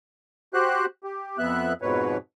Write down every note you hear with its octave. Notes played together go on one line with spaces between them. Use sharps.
F#4 G4 C5 F#6
G4
F2 B3 E5 F#6
F2 G#2 B2 B4 C#5